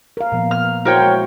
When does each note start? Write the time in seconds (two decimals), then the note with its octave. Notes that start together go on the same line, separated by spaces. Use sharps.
0.17 A#4 F5
0.32 A#2 F3 B3
0.51 F6
0.85 E4 F#4 A#4 C5 C#5 G5
1.01 G#3